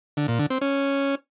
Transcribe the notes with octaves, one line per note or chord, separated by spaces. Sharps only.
D3
A#2
D3
C4
C#4